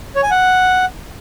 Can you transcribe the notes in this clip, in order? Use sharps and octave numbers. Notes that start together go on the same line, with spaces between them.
C#5
G#5
F#5